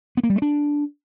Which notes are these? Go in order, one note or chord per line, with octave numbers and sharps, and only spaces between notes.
B3
A#3
G3
A3
D4